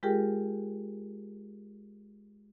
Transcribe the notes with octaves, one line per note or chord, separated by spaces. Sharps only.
G#3 F4 G4 G#4 A#4 G5